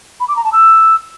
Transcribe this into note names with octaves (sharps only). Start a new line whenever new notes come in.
B5
D6
A#5
A5
E6